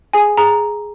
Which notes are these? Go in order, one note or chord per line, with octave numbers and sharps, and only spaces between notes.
G#4 G#5
G#4 A#5